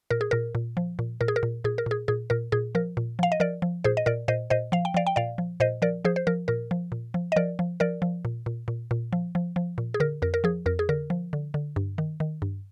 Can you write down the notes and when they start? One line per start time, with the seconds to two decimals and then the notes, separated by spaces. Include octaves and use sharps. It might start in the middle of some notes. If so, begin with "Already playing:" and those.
0.11 A#2 A#4
0.21 G#4
0.31 A#2 A#4
0.55 A#2
0.77 F3
0.99 A#2
1.21 A#2 A#4
1.28 G#4
1.36 A#4
1.43 A#2
1.64 A#2 G#4
1.78 A#4
1.86 A#2 G#4
2.08 A#2 G#4
2.30 A#2 A#4
2.52 A#2 G#4
2.75 F3 A#4
2.97 A#2
3.19 F3 F5
3.32 D#5
3.40 F3 A#4 D5
3.62 F3
3.84 A#2 G#4 C5
3.97 D#5
4.06 A#2 A#4 D5
4.28 A#2 C5 D#5
4.50 A#2 C5 D#5
4.72 F3 F5
4.85 G5
4.94 F3 D5 F5
5.07 G5
5.16 A#2 D5 F5
5.38 F3
5.60 A#2 C5 D#5
5.82 F3 A#4 D5
6.05 F3 G#4 C5
6.16 C5
6.27 F3 A#4
6.48 A#2 A#4
6.71 F3
6.92 A#2
7.14 F3
7.32 D#5
7.36 F3 A#4 D5
7.59 F3
7.80 F3 A#4 D5
8.02 F3
8.25 A#2
8.46 A#2
8.68 A#2
8.91 A#2
9.13 F3
9.35 F3
9.56 F3
9.78 A#2
9.94 G#4
10.00 D3 A#4
10.22 F2 A#4
10.34 A#4
10.44 F3 G#4
10.66 F2 A#4
10.79 G#4
10.89 D3 A#4
11.10 F3
11.33 D3
11.54 D3
11.76 G2
11.98 D#3
12.20 D#3
12.42 G2